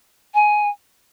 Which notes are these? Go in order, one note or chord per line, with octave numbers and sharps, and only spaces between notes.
G#5